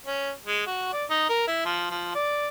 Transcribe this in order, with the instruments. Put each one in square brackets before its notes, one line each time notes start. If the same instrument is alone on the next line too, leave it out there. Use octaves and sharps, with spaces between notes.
[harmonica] C#4
G#3
F#4
D5
D#4
A#4
E4
F3
F3
D5